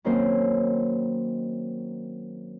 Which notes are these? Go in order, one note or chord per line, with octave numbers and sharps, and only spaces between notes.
D#3 F#3 A#3 C4 C#4 C5